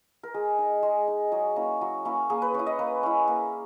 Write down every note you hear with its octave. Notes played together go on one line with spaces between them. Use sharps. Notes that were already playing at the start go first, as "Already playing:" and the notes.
A#4
G#3 G#4
D#4
G#3
D#4
F#3 G#4
A#3 C#4 E4
F#3
A#3 C#4 E4
A#3 G#4
B4
C#4 E4 C#5
D#5
A#3 B4
C#4 E4
A#3